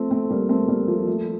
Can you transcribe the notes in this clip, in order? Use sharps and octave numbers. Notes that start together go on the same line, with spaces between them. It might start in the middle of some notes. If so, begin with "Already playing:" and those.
Already playing: F3 A3 C4
A3 C4
G3 A#3
A3 C4
G3 A#3
F3 A3
F3 A3